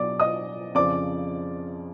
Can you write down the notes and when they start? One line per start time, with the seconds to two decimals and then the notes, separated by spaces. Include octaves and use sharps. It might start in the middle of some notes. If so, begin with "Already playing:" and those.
Already playing: B2 F#3 D5 D6
0.20 D#5 D#6
0.75 F2 C#3 F3 D5 D6